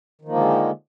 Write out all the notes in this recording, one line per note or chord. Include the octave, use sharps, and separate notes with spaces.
D3 D#3 F3 G#3 A#3